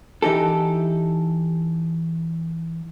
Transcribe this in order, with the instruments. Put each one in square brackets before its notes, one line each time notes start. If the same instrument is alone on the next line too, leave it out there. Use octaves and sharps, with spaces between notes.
[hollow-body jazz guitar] E3 D#4 G4 A4